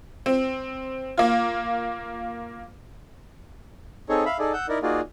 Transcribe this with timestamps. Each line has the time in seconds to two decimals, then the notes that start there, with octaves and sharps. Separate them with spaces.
0.26 C4
1.18 A#3 F4
4.09 C4 D#4 G#4 A4 C#5
4.26 E5 F5 B5
4.39 D#4 G#4 A4 D5
4.53 F#5 E6 G6
4.68 D#4 E4 A#4 D5
4.82 A#3 D#4 F4 F#4 G#4 D5